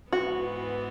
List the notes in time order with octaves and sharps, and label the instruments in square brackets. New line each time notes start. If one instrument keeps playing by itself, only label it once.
[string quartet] G#2 E3 B3 [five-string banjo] F#4